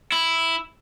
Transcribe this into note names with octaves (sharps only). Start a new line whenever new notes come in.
E4